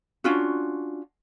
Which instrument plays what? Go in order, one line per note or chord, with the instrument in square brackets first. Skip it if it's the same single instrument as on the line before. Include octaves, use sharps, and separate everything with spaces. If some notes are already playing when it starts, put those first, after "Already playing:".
[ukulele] C#4 D4 F4 F#4